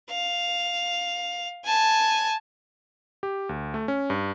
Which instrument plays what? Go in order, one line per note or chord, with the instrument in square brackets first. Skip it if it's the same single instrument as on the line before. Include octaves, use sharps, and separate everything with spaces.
[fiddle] F5
G#5 A5
[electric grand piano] G4
D2
A3
C#4
G2